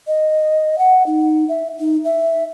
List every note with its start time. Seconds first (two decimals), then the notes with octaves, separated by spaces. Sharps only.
0.07 D#5
0.78 F#5
1.06 D#4
1.49 E5
1.80 D#4
2.05 E5